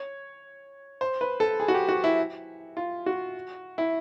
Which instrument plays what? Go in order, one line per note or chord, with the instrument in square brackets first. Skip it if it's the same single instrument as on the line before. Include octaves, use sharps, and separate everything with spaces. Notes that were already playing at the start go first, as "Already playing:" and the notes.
Already playing: [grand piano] C#5
C5
B4
A4
G#4
F#4
G4
F#4
E4
F4
F#4
E4